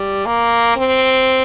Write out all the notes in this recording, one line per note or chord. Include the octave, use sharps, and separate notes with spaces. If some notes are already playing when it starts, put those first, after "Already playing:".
Already playing: G3
A#3
C4